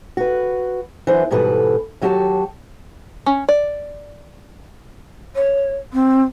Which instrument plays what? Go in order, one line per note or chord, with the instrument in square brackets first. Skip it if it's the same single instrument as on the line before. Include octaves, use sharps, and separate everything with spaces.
[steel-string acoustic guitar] F#4 B4
E3 F#3 B3 D4 C5
G#2 B2 E3 G3 A4 B4
D#2 F#3 F#4 G4 F#5 A5
[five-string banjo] C#4
D5
[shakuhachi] C#5
C4